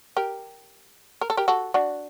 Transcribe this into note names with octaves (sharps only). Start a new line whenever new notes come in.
G4 A#4
A#4
A4
G4 A#4
F#4 A4
D4 F#4